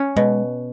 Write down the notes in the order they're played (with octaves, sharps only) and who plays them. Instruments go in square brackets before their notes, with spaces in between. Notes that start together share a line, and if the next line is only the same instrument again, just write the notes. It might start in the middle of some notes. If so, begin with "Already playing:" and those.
Already playing: [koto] C#4
[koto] B2 [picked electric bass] G#3